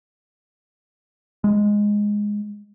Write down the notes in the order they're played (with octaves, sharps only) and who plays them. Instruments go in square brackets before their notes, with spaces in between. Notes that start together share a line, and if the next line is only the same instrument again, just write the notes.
[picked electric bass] G#3